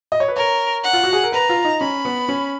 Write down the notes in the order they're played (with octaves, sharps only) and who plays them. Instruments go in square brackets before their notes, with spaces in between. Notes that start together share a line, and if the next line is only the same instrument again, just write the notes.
[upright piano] D#5
C#5
B4
[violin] A#4 [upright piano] C#5
[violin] F#5
[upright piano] F4
F#4
G#4
A#4
[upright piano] B4 [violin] A#5
[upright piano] F4
D#4
[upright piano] C#4 [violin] B5
[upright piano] B3
C#4